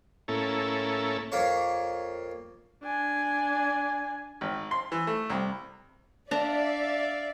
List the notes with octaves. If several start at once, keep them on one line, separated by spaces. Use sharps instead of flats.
A2 A#3 C#4 E4 A4
F2 A#3 C#5
D4 G#5
G#1
C6
E3
A3
C2
D4 D5 E5 F5 A5 A#5